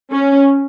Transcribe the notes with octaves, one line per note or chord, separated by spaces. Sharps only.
C#4